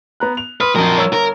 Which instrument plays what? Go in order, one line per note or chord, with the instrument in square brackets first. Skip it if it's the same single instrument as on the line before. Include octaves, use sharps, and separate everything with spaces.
[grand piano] B3 A#5 F#6
F7
[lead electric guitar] B4 [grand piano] C6 D#6 F6
[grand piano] F2 F#3 [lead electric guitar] F3 A#4
[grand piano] G1 C#5 E6
[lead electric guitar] A#4